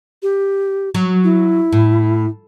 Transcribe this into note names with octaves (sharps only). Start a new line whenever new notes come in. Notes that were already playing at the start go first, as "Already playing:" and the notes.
G4
F#3
E4
A2